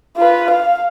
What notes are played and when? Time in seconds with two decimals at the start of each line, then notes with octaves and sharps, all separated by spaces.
0.17 F4 B4
0.51 F5